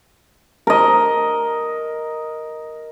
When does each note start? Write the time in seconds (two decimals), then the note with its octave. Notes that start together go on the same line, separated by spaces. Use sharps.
0.67 A#4 D#5